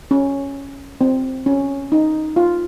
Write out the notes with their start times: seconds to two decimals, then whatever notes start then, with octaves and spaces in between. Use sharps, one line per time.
0.11 C#4
1.01 C4
1.46 C#4
1.92 D#4
2.36 F4